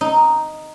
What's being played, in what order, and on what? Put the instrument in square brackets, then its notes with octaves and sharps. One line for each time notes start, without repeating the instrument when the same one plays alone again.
[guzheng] D#4